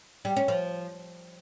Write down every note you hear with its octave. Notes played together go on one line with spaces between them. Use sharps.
G3
C#4
F3